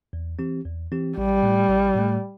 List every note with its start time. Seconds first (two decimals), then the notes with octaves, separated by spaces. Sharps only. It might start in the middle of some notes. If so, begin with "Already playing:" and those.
0.13 E2
0.39 E3 C4 G4
0.65 E2
0.92 E3 C4 G4
1.17 A1 G3
1.43 A2 A3
1.69 A1
1.96 A2 A3